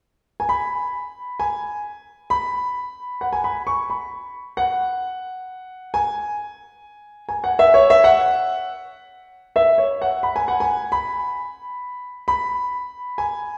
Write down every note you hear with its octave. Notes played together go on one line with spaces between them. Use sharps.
G#5
B5
G#5
B5
F#5
G#5
B5
C#6
B5
F#5
G#5
G#5
F#5
E5
C#5
E5
F#5
E5
C#5
F#5
B5
G#5
F#5
G#5
B5
B5
G#5